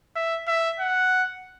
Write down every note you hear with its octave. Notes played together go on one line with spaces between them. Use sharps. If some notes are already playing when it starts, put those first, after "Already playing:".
E5
E5
F#5